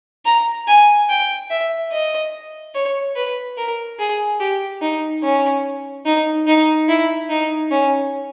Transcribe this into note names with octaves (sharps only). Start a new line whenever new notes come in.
A#5
G#5
G5
E5
D#5
C#5
B4
A#4
G#4
G4
D#4
C#4
D#4
D#4
E4
D#4
C#4